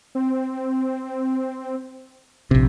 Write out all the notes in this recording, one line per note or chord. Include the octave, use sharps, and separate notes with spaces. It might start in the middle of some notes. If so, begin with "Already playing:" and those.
C4
A#1 C3